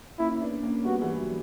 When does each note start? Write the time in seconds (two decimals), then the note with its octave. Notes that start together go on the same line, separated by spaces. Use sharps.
0.19 A#3 C#4 E4
0.41 B3 D4
0.63 A#3 C#4
0.85 G3 B3 F#4
1.01 E3 G3
1.18 F#3